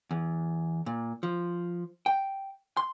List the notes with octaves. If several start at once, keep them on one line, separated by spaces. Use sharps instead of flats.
E2
A#2
F3
G5
C6